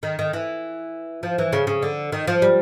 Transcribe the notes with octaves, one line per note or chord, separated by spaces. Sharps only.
D#3
D#3
E3
F3
E3
C#3
C#3
D3
D#3
F3
G3